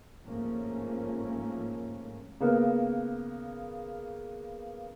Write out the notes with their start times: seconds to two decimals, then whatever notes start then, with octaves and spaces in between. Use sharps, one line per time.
0.24 G#1 G#2 F3 A3 A#3 C#4
2.40 C#3 A#3 B3 A#4